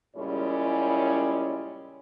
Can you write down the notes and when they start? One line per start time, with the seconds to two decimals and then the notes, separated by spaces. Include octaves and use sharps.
0.16 A#2 C#3 G3 G#3 C#4 E4